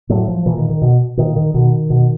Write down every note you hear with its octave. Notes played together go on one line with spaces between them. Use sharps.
A2 F#3
F3
A#2 E3
D#3
D#3
B2
A#2 D#3
D#3
B2 D#3
B2